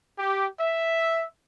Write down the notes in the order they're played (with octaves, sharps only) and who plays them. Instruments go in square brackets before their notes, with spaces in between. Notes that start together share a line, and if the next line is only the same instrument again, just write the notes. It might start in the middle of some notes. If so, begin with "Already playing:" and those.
[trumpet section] G4
E5